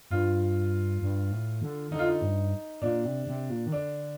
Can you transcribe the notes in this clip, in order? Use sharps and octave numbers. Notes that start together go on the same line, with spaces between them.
G2 F4
G2
A2
D3
D3 D#4
F4
D#4
G2
A#2 D4
C3
C3
A#2
D#3
D3 D4